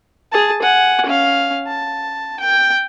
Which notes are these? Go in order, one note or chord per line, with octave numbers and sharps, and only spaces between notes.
G#4 A5
F#5 G#5
C#4 F5
A5
G5